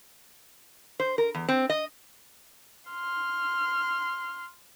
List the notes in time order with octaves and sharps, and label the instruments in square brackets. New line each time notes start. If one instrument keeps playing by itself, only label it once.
[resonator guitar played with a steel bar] C5
A#4
E2
C4
D#5
[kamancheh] C6 F6